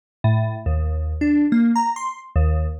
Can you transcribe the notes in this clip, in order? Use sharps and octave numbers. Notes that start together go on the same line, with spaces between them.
A2
D#2
D4
A#3
A#5
C6
D#2